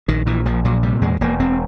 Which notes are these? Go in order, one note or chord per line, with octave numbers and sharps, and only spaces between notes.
A#1 D#3
A#2 E3
A#1 F3
A#2 F#3
C3 G3
E2 G#3
E1 A#3
E1 C4